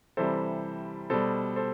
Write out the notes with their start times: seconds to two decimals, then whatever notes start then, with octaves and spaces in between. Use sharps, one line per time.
0.17 C3 E3 G3 A4 C5
1.10 B2 G3 A4 C5
1.56 A4 C5